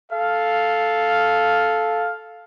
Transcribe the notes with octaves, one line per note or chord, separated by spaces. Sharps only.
A4 F5